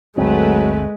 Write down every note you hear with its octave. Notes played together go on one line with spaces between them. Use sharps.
G1 D2 F#3 G#3 A3 C4 B4